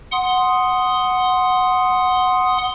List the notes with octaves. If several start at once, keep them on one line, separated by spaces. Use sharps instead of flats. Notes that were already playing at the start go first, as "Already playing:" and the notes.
F#5 C6 D#6